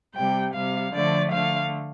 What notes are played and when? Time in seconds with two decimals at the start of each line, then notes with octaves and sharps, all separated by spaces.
0.14 C3 G3 G5
0.54 C3 G3 F5
0.93 D3 F3 A3 D5
1.32 D3 A3 F5